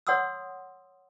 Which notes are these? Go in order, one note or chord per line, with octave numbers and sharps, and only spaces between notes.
C#5 F#5 C6 D#6 E6